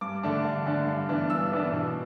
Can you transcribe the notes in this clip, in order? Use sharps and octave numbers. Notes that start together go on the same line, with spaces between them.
G2 D6
D3 A3 D4
G2
D3 A3 D4
G2
E3 B3 D4
G2 E6
E3 B3 D4
B2